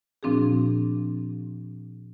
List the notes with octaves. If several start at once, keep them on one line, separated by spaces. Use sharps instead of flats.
A#2 F3 C4 D4 F#4 G#4